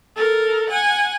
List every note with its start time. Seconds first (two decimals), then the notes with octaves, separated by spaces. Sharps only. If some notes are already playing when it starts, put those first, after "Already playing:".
0.16 A4 A#4
0.70 F#5 G#5